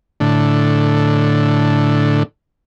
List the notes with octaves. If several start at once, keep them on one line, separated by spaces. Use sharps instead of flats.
A2 D3